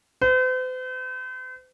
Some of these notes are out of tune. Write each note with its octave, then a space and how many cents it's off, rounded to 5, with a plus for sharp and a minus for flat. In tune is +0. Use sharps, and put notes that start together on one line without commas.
C5 -45